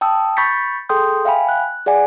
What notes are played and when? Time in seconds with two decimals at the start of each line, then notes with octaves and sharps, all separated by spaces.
0.01 G5 A5 D#6 E6
0.37 B5 C#6 G6 A6 B6 C#7
0.89 G#4 A4 G5 C6 D#6 G6
1.25 E5 F5 G5 G#5 B5
1.49 F#6
1.86 G#4 D5 F#5 G#5